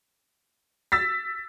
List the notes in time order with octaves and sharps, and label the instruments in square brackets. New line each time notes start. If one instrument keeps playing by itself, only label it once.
[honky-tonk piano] E6 A6 B6